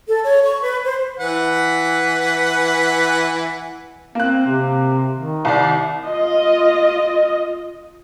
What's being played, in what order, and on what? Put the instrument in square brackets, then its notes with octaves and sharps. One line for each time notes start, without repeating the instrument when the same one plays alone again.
[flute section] A4
C#5
C#6
B4
C5
[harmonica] E3 B4 F#5
[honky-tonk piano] A#3 F#6 [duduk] C4
[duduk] C3
D#3
[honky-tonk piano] C2 D5
[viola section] F4 D#5